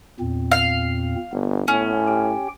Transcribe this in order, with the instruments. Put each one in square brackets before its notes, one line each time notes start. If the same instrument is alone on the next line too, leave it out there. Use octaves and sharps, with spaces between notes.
[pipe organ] E2 A#2 C4
[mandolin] F5
[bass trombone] G1 [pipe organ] B3
[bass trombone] A2 [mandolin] C#4
[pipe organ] G4 G5